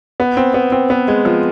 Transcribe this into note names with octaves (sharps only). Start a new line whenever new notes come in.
B3
C4
B3
C4
B3
G#3
F3